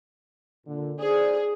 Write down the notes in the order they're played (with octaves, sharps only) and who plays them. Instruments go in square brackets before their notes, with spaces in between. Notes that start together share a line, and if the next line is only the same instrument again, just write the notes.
[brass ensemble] A#2 D3
[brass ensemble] D#4 C5 D5 [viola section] G#4